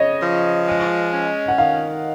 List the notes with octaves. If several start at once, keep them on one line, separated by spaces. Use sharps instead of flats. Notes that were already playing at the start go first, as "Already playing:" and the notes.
Already playing: C#3 C#5 D#5
F3
G#3
C#4
F#5
D#3 F5